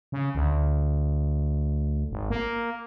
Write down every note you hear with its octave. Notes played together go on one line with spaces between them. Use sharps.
C#3
D2
G#1
A#3